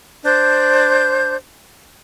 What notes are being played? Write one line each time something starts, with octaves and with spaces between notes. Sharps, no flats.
D4 C5 G6